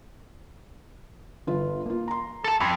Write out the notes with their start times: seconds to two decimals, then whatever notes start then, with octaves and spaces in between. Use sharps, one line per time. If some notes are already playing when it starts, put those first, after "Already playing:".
1.47 G1 F4 B4
1.86 A#3 F4
2.08 A#5 C6
2.44 A4 A5
2.60 F2 B5 E6 G#6